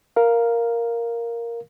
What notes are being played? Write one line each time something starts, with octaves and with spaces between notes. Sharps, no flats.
A#4 F5